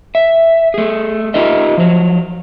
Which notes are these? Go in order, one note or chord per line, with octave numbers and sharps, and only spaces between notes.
E5
A3 G#4
D#4 F4 G4 A#4 D#5 E5
F3 F#3